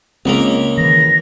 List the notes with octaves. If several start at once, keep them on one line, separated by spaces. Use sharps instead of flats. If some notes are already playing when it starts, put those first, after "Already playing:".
C#2 G#3 A#3 C4
D#3 E3 A#6